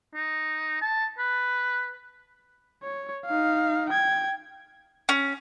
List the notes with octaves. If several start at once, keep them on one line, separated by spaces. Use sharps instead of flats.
D#4
A5
B4
C#5
D#4 F5
G5 G#6
C#4